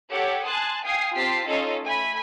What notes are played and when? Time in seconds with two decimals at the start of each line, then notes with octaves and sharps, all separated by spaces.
0.11 G4 A4 C#5 F#5
0.47 G#5 A5 C6 D#6 F#6
0.84 F5 G5 G#5 D#6 C7
1.15 C4 F4 G4 A5 B6 C7
1.47 C#4 D#4 F4 A4 D#5 F5
1.83 A3 G#5 B5 B6